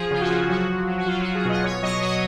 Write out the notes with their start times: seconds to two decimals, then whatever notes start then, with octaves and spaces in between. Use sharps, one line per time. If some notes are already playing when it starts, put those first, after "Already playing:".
Already playing: F3 G#4
0.10 C#3 F4
0.21 F#4
0.30 F3
0.49 F#3 F#4
0.68 F#3
0.87 F#3
0.98 F#4
1.06 F#3 F4
1.20 F#3 F#4
1.35 G#4
1.45 B2 D#5
1.64 B2 C#5
1.82 F#3 D#5
2.02 F#3 C#5